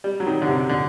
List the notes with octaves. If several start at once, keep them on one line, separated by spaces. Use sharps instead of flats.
G3
F#3
D#3
D3
C3
D3